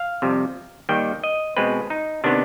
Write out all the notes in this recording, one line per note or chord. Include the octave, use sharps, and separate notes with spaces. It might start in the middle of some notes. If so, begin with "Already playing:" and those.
Already playing: F5
F2 C3 G3
D#2 D#3 G3 G5
D#5
B2 G#3 C4 B4
D#4
C3 D#3 B3 D4